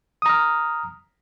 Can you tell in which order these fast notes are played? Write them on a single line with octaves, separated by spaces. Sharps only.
D#6 A#5 F6